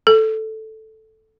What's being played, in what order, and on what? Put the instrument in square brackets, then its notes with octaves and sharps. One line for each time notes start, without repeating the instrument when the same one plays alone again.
[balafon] A4